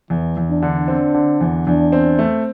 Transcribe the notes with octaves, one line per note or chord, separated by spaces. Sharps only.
E2 E3
E2
D4
D3
C4 D4
D3
E2
E2 D4
C4
A3